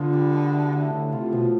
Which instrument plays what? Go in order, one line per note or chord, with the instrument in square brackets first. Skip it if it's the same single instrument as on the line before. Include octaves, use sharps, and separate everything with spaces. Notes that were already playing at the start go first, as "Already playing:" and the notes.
Already playing: [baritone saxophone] D3 [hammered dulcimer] B3 F4
[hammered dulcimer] G3
B2
E4
A3
[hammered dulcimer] A2 [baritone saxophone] D3
[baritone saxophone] C3 [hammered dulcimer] F4
[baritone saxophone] B2 [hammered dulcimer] F3